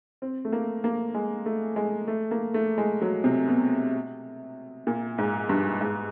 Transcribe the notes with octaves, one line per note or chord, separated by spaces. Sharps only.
C4
A3
A#3
A#3
G#3
A3
G#3
A3
A#3
A3
G#3
F#3
C3
B2
A#2
G#2
G2
G#2